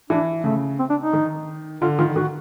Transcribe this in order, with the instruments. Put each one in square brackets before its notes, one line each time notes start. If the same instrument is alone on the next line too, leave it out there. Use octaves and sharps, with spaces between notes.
[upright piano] E3 [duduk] D4
[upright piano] C#3 [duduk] A3
[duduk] C4
D4
D#4
[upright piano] D#3
[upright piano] D3 [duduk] F4
[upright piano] D#3 [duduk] F4
[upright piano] D3
[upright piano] D#3 [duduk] F#4